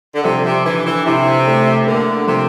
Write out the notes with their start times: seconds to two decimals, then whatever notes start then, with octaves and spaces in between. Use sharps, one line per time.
0.15 D3
0.24 C3 F3
0.45 C3
0.65 D3 E3
0.86 E3
1.06 C3 E4
1.47 A3
1.87 D3 A#3
2.27 C3 F3